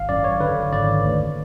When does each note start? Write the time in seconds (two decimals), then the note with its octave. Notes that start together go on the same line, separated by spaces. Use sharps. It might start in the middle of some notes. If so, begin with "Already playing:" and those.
Already playing: G#1 F5
0.09 F#2 D5
0.24 C#5
0.40 D3 B4
0.72 G#1 D5
1.04 D2